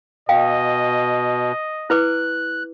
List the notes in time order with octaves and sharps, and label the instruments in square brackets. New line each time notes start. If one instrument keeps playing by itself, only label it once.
[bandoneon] B2 [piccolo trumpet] D#5 [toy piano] F5 G5
[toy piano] E4 B4 D6 [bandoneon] F#6